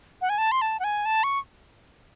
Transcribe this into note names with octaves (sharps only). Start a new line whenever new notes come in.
F#5
G#5
A5
C6
A5
F#5
G#5
A5
C#6